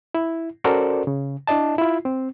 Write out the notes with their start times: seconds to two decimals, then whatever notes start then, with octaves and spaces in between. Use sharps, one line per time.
0.15 E4
0.64 C#4 F#4 A4 A#4 C5 D5
1.07 C#3
1.47 D4 E4 D5 D#5 A5
1.78 E4 F4
2.05 C4